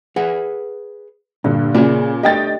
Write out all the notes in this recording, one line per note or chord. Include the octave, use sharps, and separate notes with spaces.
G#4 B4 F#5
G2 A#2 D3
A#2 C#3 G#4 D5
A3 D4 G4 D#5 G5 A6